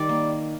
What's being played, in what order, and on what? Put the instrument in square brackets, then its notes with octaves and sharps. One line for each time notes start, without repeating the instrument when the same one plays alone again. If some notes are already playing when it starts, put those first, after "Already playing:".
Already playing: [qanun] D#3 G3 D5
A#3